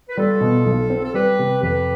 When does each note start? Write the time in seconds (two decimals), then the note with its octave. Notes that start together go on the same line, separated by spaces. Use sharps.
0.09 B4
0.17 G3 F4 A4
0.41 B2
0.66 B1
0.90 C4
1.03 A4
1.14 G3 G4 B4
1.39 C3
1.62 F2 G4 B4